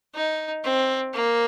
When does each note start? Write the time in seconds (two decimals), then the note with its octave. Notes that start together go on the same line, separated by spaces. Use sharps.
0.15 D#4
0.64 C4
1.13 A#3